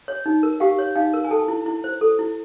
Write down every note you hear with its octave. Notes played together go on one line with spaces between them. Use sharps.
C#5
D#4
A#4
G4 F5 G5
C#5
D#4 F5 G5
A#4
G#5
A4 G5 A5
E4
E4
C5
A4
E4